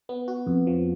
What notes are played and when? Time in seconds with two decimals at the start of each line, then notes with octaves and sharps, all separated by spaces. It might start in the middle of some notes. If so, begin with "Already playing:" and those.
0.09 B3
0.28 F#4
0.47 F2
0.67 F3